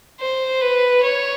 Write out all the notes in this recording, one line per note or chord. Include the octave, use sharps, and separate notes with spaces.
C5
B4
C#5